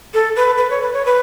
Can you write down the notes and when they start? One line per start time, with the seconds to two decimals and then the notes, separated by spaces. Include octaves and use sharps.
0.14 A4
0.36 B4
0.57 B4
0.70 C#5
0.82 B4
0.93 C#5
1.05 B4